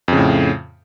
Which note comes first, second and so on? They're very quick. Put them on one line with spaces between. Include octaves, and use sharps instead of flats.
F2 C#3 A2